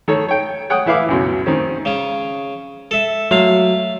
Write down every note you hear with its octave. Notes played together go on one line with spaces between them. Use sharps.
D#3 A4 C#5
C#5 G5
C#5 F#5 G5 D#6
E3 E4 B4 F5 D6
C#2 F#2 B2
D#3 C4 C#4
C#3 C#4
A4 E5
F#3 A3 F5